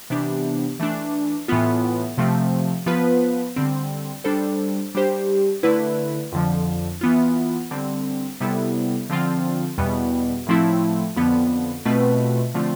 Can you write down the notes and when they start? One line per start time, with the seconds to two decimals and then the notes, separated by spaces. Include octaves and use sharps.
0.10 C3 E3 B3 D4 G4
0.80 E3 A3 D4
1.48 A2 E3 B3 F4
2.17 C3 F3 A3 C4
2.86 F3 B3 F4 B4
3.56 D3 G3 C4
4.24 G3 D4 A4 C5
4.95 G3 D4 G4 C5
5.63 D3 A3 E4 B4
6.32 F2 D3 F3
7.01 E3 B3 F4
7.71 D3 G3 C4
8.40 C3 G3 B3 E4 A4
9.10 D3 F3 C4 F4
9.78 E2 B2 G3 B3
10.47 A2 F3 A3 C4 E4
11.16 F2 D3 F3 B3
11.86 B2 A3 C4 F4 B4
12.55 D3 F3 A3 C4 F4